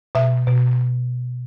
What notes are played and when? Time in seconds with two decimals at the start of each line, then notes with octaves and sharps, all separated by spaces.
0.15 B2 E5
0.47 B2